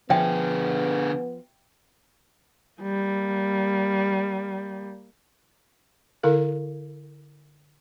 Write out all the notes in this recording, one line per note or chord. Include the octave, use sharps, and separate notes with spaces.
D3 F3 B3 G#4 E5 G5
G3 A#3
D3 E4 A4 A#4 F5